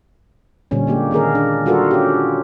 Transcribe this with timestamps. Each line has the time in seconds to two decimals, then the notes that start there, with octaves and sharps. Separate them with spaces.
0.71 A#2 D3 G3 C#4
0.87 G#3 A#3 G4
1.11 D#3 A#3 G#4 A#4
1.35 D4
1.66 G3 F4 F#4 A4 A#4
1.91 C#4 G4